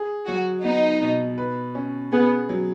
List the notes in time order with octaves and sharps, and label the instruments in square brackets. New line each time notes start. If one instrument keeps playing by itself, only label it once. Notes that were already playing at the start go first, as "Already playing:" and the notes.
Already playing: [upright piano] G#4
[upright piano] F#3 [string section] F#4
[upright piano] B3 [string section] D#4
[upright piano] B2
B4
C#4
[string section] B3 [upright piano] G#4
[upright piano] F#3